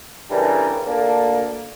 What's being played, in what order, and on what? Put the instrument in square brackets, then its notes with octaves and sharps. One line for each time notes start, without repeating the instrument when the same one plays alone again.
[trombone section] C#3 E3 G3 D4 A4 A#4
D2 A#2 A#3 D4 A4